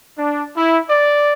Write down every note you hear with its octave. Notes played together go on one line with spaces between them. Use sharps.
D4
E4
D5